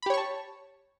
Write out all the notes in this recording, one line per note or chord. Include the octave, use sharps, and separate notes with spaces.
G4 C#5 A5 B5 C#6